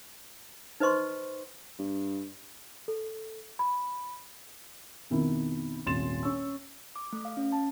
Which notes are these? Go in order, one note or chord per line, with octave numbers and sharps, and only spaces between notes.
D#4 B4 C5 D#5 C6 C#6
G2
A4
B5
F2 B2 D#3 E4
D#1 G#1 C6 A6 E7
C#4 C#6 E6
D6
A3
F5
C#4
A5